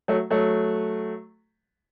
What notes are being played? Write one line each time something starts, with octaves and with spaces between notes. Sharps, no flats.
F#3 A3
F#3 A3